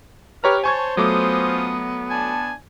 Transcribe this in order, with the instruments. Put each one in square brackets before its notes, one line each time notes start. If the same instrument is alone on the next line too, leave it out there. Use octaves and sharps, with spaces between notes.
[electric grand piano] G4 C#5 A#5 [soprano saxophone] B4 [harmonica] F6
[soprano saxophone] C5 [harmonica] C#5 A5 [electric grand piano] G#5 C#6 G#6
[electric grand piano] F#3 A3 D6 [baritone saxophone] B3 [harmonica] C#4 F4 D#6
[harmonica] D4 G#5 [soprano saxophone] A5